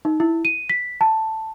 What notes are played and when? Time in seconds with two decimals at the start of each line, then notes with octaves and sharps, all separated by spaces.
0.05 D#4
0.20 E4
0.45 D#7
0.70 B6
1.01 A5